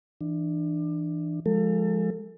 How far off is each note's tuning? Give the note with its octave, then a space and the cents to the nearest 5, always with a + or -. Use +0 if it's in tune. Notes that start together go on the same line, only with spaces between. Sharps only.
E3 +0 D4 +25
F3 +0 G#3 +0 A4 +30